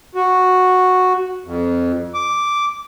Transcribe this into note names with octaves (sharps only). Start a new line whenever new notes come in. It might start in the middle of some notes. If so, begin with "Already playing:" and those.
F#4
F2
D6